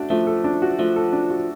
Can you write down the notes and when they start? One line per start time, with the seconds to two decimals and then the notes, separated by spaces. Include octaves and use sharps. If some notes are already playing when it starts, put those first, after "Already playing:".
Already playing: A3 D4 F#4
0.10 F3 A3
0.27 A4
0.44 D4
0.62 F#4
0.79 F3 A3
0.96 A4
1.13 D4
1.31 F#4